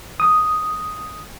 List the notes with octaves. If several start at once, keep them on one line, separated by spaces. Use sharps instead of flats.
D#6